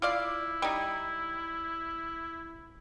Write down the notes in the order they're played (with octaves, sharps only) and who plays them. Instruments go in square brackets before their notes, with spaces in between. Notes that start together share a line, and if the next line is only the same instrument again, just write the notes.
[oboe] E4 [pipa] F4 D5 F5
[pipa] G3 D#4